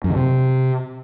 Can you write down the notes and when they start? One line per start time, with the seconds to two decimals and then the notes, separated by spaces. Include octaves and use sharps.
0.04 F#2
0.10 D#3
0.16 C3